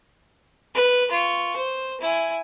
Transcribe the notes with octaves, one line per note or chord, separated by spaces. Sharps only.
B4
F4 C#6
C5
E4 G#5